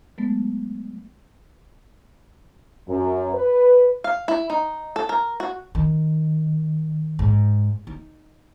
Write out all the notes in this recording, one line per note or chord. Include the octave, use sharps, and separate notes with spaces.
F#3 G#3 A3 B3
F#2
B4
F5
E4
D#4
A4
A#4
F#4
D#3
G#2
D#4